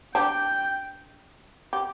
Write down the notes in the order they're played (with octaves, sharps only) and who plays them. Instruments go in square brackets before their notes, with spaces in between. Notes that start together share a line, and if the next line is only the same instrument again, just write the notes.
[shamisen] D4 G4 [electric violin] G5
[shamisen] G4